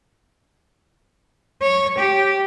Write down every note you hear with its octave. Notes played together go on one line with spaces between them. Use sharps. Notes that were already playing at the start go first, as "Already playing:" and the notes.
C#5
G4